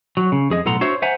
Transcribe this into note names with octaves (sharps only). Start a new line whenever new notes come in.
F#3
C#3
F2 G#4 D#5
B1 A2 A4 F#5 A#5 C6
D4 F#4 C5 C#5 E5
C5 E5 F#5 G#5 A#5